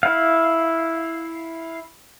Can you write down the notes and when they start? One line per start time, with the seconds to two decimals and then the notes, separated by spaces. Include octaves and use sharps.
0.03 E4 F5